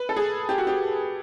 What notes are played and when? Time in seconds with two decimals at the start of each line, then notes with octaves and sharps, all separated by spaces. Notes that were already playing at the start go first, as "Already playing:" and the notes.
Already playing: B4
0.09 A4
0.16 G#4
0.49 G4
0.58 F#4
0.67 G4